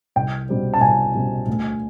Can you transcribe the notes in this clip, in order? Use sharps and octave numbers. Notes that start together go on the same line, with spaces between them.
C2 G5
B2 G3 C4
A5
C2 G#5
B2 G3 C4
D2